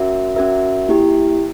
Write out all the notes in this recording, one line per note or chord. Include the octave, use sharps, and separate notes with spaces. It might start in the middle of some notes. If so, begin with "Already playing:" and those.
Already playing: C#4 F#4 A#4 E5
C#4 F#4 A#4 E5
A#3 E4 G4